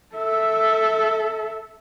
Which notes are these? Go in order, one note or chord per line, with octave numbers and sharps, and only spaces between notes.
A4 E5